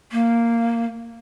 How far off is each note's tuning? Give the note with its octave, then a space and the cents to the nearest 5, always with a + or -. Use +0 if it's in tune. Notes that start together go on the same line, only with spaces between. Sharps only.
A#3 -5